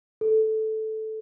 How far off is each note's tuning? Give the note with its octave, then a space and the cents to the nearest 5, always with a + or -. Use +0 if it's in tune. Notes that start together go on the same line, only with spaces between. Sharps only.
A4 -5